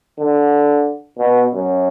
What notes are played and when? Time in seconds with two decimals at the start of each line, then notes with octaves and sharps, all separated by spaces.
0.19 D3
1.19 B2
1.53 F#2